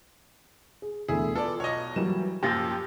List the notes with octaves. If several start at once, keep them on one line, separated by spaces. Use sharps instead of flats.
G#4
E1 D2 E4 G#4
B3 F4 A4 D5
B1 C#5 D#5
E3 F#3 G3 A#3 E7
F#2 A#2 F3 G4 E6 G6 A6 A#6